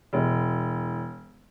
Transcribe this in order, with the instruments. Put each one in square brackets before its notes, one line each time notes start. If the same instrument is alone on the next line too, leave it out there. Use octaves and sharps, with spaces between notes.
[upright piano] E1